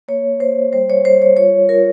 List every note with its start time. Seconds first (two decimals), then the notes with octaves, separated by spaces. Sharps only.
0.08 A#3 C#5
0.40 A#3 C5
0.73 G3 C5
0.90 C#5
1.05 G3 C5
1.22 C#5
1.37 F4 C#5
1.69 F4 A#4